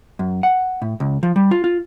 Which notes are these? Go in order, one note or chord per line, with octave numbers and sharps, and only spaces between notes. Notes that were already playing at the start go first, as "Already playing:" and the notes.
F#2
F#5
A2
C#2
F3
G3
F4
F4